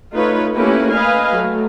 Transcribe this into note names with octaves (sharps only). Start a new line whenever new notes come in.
A3 D#4 F4 B4 C#5
A3 A#3 C#4 E4 G4 B4
B4 D#5 F5 G#5
F#3 A3